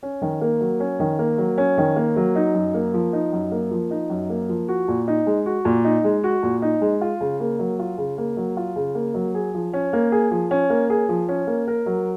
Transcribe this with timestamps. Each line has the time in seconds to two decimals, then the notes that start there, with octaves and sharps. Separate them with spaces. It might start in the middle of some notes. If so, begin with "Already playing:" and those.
0.03 C#4
0.22 D#3
0.41 A#3
0.60 F#3
0.80 C#4
1.00 D#3
1.19 A#3
1.38 F#3
1.58 C#4
1.78 D#3
1.96 A#3
2.16 F#3
2.35 D#4
2.54 F#2
2.74 A#3
2.94 F3
3.13 D#4
3.32 F#2
3.52 A#3
3.71 F3
3.91 D#4
4.10 F#2
4.29 A#3
4.49 F3
4.68 F#4
4.88 A#2
5.08 D#4
5.26 G#3
5.46 F#4
5.65 A#2
5.84 D#4
6.04 G#3
6.24 F#4
6.43 A#2
6.62 D#4
6.81 G#3
7.01 F4
7.20 C#3
7.40 A#3
7.59 F#3
7.79 F4
7.98 C#3
8.18 A#3
8.37 F#3
8.57 F4
8.76 C#3
8.95 A#3
9.14 F#3
9.34 G#4
9.54 F3
9.73 C#4
9.93 A#3
10.12 G#4
10.31 F3
10.51 C#4
10.70 A#3
10.90 G#4
11.09 F3
11.28 C#4
11.47 A#3
11.67 A#4
11.86 F#3